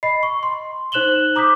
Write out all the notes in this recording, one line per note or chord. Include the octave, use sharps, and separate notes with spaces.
D#5 B5 C7
C#6
C6
D#4 C5 F#6 E7 F#7 G7
A#5 D6 D#6 G6 B6